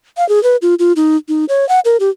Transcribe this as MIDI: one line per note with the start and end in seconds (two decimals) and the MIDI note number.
0.17 0.27 77
0.29 0.42 68
0.43 0.56 71
0.62 0.75 65
0.79 0.93 65
0.96 1.17 63
1.29 1.45 63
1.49 1.67 73
1.69 1.80 78
1.85 1.97 70
2.00 2.10 67